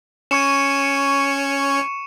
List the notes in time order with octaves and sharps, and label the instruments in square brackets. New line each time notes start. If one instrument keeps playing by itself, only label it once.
[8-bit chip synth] C#4 C#5 [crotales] C#6 C#7 E7